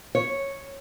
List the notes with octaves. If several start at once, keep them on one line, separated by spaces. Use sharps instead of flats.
C#5